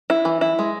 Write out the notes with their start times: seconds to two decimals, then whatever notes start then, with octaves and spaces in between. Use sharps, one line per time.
0.10 E4
0.25 E3
0.41 E4
0.59 G#3